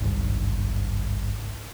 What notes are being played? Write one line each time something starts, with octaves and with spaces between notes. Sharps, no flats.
G#1 C#2 G2